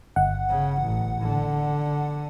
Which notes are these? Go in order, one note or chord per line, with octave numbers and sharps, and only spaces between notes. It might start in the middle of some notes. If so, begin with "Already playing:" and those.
G1 F#5
C#3
A1
D3